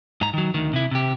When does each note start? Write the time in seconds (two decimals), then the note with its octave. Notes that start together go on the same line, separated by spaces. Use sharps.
0.21 G#2 A#5
0.34 D#3 F#3
0.54 D2 D#3
0.73 C3 E4
0.91 C3 G4